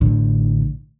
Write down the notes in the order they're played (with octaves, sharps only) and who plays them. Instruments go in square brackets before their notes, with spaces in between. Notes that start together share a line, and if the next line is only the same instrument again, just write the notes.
[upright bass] A1 D3